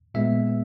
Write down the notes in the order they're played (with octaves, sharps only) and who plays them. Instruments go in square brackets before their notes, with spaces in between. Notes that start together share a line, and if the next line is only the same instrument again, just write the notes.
[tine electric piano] A#2 G#3 B3 E5